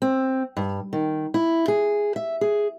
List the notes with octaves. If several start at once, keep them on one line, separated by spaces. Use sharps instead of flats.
C4
G2
D#3
E4
G#4
E5
G#4